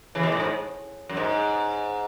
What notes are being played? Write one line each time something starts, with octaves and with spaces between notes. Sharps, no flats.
C#3 E3
B2
A2
G#2
F#2
G#2